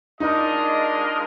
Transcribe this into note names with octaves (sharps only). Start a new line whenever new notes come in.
G#3 D4 D#4 F4 A#4 D#5